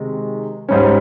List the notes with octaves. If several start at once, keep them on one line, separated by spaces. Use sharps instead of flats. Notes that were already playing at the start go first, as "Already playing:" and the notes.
Already playing: C3 D#3 G#3
G#2 G3 C#4